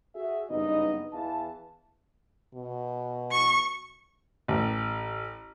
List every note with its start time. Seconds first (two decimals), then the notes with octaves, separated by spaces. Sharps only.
0.16 F#4 G#4 E5
0.50 F#1 G2 B3 D#4 D#5
1.13 E2 E3 F5 A5
2.54 B2
3.32 C#6
4.48 A1